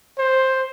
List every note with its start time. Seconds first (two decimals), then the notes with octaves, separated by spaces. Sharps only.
0.18 C5